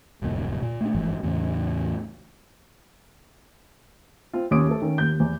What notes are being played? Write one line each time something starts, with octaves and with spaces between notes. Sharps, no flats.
D1 C2 F2 A#3
A#2
A3 A#3 C4 D4
G1 G#2 E3 F3
E2 A2 C#3
C4 F4
D#2 C#4 D6 D#6 D7
A3 A4
D#3 C#4
D#2 G6
E2